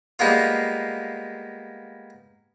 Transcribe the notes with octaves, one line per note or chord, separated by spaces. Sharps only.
G3 G#3 A#3 B3 F4